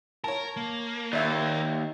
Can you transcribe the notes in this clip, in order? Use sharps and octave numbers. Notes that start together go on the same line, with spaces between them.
A#4 C#5 A5
A#3
D#2 D5 E5 E6